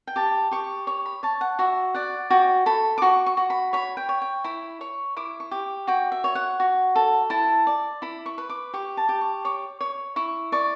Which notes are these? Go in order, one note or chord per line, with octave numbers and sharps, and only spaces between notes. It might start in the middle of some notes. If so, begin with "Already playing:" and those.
G5
G4 A5
G4 C#6
C#5 C#6
B5
C#5 A5
F#5
F#4 E5
D5 F#5
F#4 G5
A4 B5
D6
F#4 C#6
C#6
F#4
B5
C#5 B5
G5
C#5
G5
E4 B5
C#5 C#6
E4 D6
C#6
G4
F#4 G5
E5
C#5
F#5
F#4
A4
E4 A5
D5
E4 B5
C#6
B4
D6
G4 C#6
A5
G4
C#6
C#5 D6
C#5
E4 C#6
D5 C#6